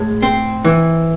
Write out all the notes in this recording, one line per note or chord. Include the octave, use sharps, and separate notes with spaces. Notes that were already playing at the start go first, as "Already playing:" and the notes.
Already playing: A2 G#3
C4
E3